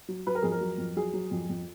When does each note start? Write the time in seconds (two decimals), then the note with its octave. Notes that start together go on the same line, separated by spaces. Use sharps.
0.08 F#3
0.27 F#3 B4
0.35 A#4
0.43 F2 G#4
0.52 A#4
0.61 F#3
0.78 F2
0.96 F#3 G#4
1.13 F#3
1.31 F2
1.49 F2